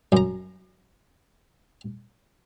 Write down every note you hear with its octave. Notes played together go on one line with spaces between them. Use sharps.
F#2 A#5